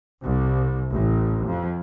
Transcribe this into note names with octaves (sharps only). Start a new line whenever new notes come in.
C2
A1
F2